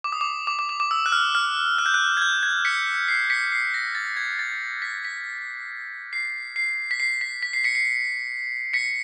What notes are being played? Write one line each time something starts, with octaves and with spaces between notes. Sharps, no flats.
D6
D#6
D6
D6
D6
D6
D6
E6
F#6
F6
F6
F#6
G6
F#6
G#6
G6
G#6
B6 C#7
C7
B6 C#7
C7
A#6
A6
G#6
A6
B6
B6
C7
C7
B6
C7
B6
B6
C7
B6 C#7
C7
B6 C#7